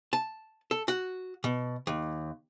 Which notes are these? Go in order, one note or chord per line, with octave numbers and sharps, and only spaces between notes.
A5
A4
F#4
B2
D#2